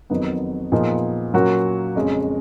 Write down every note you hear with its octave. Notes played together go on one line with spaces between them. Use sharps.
F2 D#3 F#3 B3 D#4
A#2 F3 B3 D#4 G#4
A#2 F#3 A#3 C#4 F#4
F2 C#3 G#3 C#4